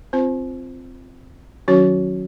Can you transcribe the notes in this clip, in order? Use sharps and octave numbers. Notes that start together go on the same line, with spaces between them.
C4 F4 C5
D#3 F#3 C#4 F#4 C#5